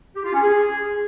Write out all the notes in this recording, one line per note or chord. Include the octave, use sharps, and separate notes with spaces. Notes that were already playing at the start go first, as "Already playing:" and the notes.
G4
F4
C#4
G#4